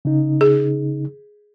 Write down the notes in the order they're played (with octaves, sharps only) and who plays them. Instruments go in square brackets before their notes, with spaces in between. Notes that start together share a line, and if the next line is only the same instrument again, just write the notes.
[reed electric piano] C#3 D#4
[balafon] G#4